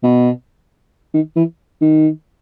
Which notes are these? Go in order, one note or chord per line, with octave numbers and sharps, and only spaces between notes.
B2
D#3
E3
D#3